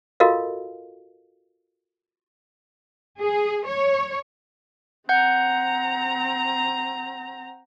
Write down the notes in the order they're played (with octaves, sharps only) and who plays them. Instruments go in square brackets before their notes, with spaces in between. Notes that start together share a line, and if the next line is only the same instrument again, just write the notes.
[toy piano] F4 F#4 A4 A#4 D#5 F5
[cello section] G#4
C#5
[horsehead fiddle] C4 A#5 [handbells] F#5 G6